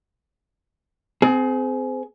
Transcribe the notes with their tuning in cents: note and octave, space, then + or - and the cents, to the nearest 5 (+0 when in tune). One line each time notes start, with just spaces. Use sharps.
C4 -25 G#4 +25